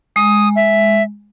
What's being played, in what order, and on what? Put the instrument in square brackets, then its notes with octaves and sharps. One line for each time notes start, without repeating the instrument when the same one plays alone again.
[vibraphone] G#3 [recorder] D#6
[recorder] E5